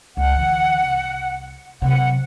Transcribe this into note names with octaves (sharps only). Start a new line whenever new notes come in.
C#2 F#5
D3 E3
C2
C3 F#3 F#5